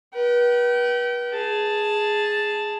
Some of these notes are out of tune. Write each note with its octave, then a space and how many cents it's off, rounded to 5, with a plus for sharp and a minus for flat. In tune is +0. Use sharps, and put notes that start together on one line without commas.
B4 -35 G5 -35
G#4 +0 A5 +0